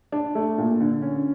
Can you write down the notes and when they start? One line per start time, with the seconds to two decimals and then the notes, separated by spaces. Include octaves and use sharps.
0.12 D4
0.35 A3
0.58 A#2
0.80 D3
1.02 C#4